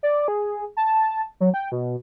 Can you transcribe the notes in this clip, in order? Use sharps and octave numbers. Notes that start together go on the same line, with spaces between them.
D5
G#4
A5
F#3
G5
B2